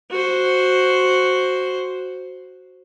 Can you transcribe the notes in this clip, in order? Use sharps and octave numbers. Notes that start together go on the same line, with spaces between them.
F#4 C5